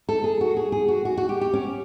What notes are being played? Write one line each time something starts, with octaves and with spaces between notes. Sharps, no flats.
A4
G#4
F#4
G#4
G#4
F#4
F#4
F#4
G4
G4
C#4